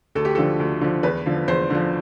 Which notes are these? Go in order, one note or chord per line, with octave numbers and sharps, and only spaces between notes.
D2 A4
G4
D3 F3 A4
D2
D3 F3
E2 B4
D3 F3
E2 C5
D3 F3